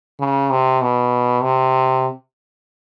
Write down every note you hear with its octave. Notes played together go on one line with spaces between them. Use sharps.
C#3
C3
B2
C3